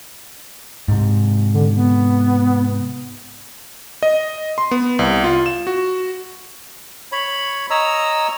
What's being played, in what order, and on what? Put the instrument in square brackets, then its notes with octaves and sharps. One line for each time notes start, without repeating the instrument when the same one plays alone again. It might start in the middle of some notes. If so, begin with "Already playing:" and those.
[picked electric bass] G#2 C3
[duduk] D3
B3
[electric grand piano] D#5
C6
B3
C2
F4
E7
F#4
[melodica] C#5 B5
C#5 D#5 A#5 E6